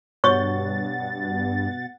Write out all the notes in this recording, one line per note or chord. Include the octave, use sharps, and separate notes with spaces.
G2 B2 C#5 F#5 C#6 A6